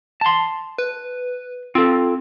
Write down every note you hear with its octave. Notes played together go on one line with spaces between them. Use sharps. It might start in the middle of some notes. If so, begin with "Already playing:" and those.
A5 C6
B4
C4 F4 A4